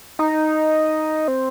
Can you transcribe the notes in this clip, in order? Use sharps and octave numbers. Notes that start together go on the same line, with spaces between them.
D#4
C4